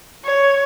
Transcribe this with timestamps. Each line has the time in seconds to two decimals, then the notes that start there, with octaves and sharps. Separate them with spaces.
0.24 C#5